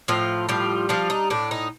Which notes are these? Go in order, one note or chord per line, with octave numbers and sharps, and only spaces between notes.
A2 F3 F4
F3 G3 F4
F3 D4 F4
D#4
A2 D4
D#4